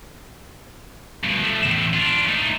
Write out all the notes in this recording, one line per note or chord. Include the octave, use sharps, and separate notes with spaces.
G2 B2
F3 A3
E2 A2
D4 F4
A3 D#4